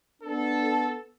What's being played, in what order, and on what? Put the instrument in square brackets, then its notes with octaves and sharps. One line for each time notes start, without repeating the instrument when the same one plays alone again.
[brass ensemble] B3 D4 A4